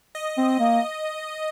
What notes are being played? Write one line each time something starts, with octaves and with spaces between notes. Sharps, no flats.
D#5
C4
A#3